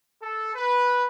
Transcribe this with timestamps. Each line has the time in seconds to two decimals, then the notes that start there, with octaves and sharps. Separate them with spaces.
0.21 A4
0.55 B4